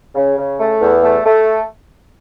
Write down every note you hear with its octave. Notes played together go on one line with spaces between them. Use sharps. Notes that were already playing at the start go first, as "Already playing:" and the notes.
C#3
C#3
A3
E2
A3
A3